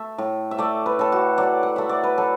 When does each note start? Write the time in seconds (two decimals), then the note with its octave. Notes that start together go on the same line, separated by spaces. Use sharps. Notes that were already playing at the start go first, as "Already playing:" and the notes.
Already playing: A3 E5
0.18 A2
0.51 E5
0.58 A3 D5
0.86 B4
0.99 A2 A4
1.12 F#4
1.38 F#3 D5
1.63 F#5
1.76 A3 E5
1.89 D5
2.03 B4
2.18 F#3 A4